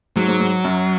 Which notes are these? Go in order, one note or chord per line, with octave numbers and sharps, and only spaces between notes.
G#2 F#3
G#2
G#2
F#2